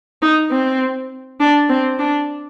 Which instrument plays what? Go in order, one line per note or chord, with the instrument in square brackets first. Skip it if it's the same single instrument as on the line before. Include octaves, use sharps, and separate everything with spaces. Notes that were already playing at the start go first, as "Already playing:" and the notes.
[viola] D#4
C4
D4
C4
D4